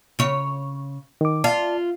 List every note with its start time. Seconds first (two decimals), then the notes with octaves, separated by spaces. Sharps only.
0.19 C#3 C#5
1.21 D#3 D6
1.44 F4 D5 A5